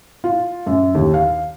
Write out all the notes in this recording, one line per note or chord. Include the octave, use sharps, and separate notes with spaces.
F4
F#2
D#2
F5